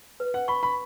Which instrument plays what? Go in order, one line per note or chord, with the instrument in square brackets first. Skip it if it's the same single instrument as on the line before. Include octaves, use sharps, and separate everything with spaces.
[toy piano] B4
[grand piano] F#5
[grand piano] B5 [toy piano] C#6
[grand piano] B5